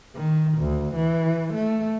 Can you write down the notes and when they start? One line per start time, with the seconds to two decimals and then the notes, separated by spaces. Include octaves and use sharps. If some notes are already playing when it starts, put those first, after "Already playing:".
0.15 D#3
0.58 D2
0.96 E3
1.54 A3